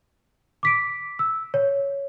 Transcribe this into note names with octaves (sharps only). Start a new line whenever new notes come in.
D6 B6 D7
E6
C#5